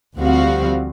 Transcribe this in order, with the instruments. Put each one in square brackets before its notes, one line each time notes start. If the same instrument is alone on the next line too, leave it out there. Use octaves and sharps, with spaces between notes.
[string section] D2 F3 G3 C4 F#4 F5